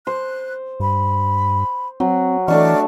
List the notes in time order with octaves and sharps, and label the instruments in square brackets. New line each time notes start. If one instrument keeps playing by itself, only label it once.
[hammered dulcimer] C5 [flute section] F#6
[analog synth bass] G2 [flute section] B5
[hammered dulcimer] F#3 [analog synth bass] C4
[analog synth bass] E3 [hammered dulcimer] A3 D4 C#6 [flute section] D5 D#5 F6